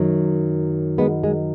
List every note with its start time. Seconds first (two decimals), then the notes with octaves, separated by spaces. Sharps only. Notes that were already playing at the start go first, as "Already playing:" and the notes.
Already playing: F#2 D#3 F#3
0.98 G#3 B3
1.24 G#3